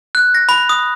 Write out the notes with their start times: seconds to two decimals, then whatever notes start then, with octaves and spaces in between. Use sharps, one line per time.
0.15 F#6
0.34 A#6
0.49 B5
0.69 D#6